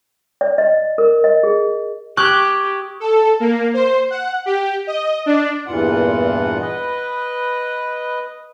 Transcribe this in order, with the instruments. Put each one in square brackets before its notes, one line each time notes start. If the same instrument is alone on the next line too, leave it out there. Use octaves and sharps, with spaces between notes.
[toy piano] D5
D#5
A#4
D#5
G#4
[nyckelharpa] G4 [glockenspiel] C#6 D#6 G#6 [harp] F#6
[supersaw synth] A4
A#3
C5
F#5
G4
D#5
D4
[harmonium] E2 G2 A#2 E3 F4 F#5
B4 D#5